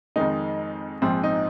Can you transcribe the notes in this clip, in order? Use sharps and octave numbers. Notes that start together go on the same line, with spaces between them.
F2 D#3 G#3 D#4
A#1 G#2 F3 C4
D#4